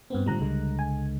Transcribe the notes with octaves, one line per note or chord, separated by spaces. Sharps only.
G2 B3 C4
A2 D3 F3 G3 A#5 F#6
C#2 D3 G#3
G#5